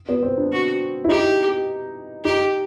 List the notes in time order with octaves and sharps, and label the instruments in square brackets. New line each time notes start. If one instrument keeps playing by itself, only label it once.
[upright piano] B3
C4
D4
[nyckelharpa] F#4
[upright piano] E4
[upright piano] D#4 [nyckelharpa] G4
[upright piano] D#4 [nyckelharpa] G4